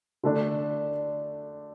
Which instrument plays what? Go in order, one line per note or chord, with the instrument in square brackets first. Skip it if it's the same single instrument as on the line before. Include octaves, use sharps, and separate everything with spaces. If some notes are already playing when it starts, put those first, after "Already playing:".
[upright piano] D3 A3 D4